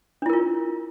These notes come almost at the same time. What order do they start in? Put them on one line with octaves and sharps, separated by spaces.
D4 E4 A#4 F4